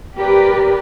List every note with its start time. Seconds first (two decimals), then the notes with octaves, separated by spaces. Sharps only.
0.18 G4 A#4 B4 D5